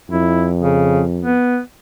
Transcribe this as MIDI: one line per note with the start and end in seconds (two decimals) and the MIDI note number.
0.10 1.38 41
0.10 0.48 64
0.62 1.02 49
1.22 1.59 59